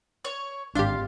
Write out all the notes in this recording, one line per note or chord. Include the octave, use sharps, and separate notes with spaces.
C#5
G#1 D4 F4 G4 F5